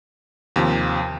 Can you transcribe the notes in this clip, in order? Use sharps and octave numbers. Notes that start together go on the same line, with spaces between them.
D#2 C3 F3